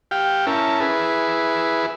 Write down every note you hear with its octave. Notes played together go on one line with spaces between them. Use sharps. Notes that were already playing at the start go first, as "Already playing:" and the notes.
G4 F5 G5
C#4 E4 A#4 A5
E4 G#4 B4